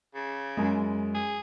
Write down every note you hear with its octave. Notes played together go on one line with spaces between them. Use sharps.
C#3
F#2 G#3
G#4